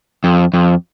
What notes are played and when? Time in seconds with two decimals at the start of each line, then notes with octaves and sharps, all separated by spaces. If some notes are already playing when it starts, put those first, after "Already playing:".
0.24 F2
0.54 F2